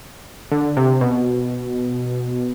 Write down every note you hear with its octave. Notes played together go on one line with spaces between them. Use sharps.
D3
C3
B2